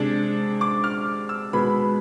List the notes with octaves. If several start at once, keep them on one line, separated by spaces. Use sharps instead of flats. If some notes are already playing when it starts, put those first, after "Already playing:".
Already playing: C3 G#3 D4
D6
F6
E6
B2 G#3 B3 B5